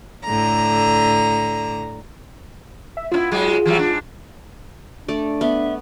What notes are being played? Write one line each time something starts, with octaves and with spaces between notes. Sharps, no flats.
A2 D3 A#5
E5
B3 C#4 E4 F4
G#2 F#3 G#3
E3 F#3 G3
G#2 D4
A3 D4 D5
B3 E5